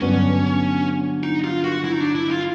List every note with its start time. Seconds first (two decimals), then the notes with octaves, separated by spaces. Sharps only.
0.01 G2 D3 F#3 B3 C#4
1.23 D#4
1.44 F4
1.64 F#4
1.84 E4
1.92 D#4
2.00 D4
2.15 E4
2.31 F4